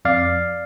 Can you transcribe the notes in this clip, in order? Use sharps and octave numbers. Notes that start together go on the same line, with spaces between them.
F2 D5 F5